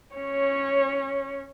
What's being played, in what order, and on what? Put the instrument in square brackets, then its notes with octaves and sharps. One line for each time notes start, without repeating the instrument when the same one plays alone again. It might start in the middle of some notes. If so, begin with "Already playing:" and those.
[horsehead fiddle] C#4 C#5